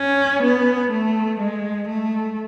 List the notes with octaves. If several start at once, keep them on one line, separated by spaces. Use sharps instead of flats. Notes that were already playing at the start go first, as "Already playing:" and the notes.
Already playing: C#4
B3
A3
G#3
A3